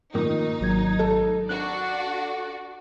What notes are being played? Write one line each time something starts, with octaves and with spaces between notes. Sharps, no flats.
A#2 D#3 D#4
G#1 F#3 G#6
A4
D4 F#4 D5 F#6